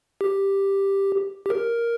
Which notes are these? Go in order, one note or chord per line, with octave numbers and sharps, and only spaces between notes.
G4
G4
A#4